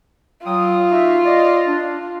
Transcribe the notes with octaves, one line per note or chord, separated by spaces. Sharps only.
F#3 F4 G5 D#6
D#4 F#4 E5
D5 D#5
D4